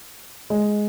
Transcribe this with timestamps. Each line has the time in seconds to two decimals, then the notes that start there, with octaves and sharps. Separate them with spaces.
0.50 G#3